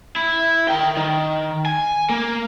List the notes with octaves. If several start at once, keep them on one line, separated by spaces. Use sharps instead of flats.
E4
A#4 G5
D#3
G#5
A#3